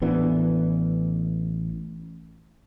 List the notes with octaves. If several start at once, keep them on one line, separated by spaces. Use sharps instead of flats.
A1 E3 B3 D4